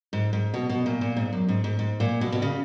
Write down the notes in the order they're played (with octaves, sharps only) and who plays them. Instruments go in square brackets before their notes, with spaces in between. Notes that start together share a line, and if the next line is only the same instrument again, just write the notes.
[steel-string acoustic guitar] G#2
G#2
B2
B2
A#2
A#2
G#2
F#2
G#2
G#2
G#2
A#2
B2
B2
C#3